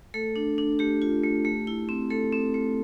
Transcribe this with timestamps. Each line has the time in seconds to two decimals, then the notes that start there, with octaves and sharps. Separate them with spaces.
0.14 A3 A4
0.36 D4
0.58 D4
0.79 A3 G4
1.02 F4
1.24 A3
1.45 A3
1.67 E4
1.89 C4
2.10 A3 A4
2.32 C4
2.54 A3